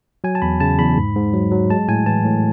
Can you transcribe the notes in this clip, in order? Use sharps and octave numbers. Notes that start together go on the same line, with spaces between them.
F#3 G#5
A5
E2 B5
C#3 A5
E2 B5
G#2
G#2
F#3
F#3
G#3 A5
A2 G#5
E3 A5
A2